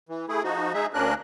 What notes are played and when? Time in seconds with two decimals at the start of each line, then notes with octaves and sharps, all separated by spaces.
0.09 E3
0.29 A3 E4 G#4
0.44 F3 D#4 F#4
0.74 G#3 D#4 G#4 E5
0.94 D2 A#3 C#4 D4 A#4 F#6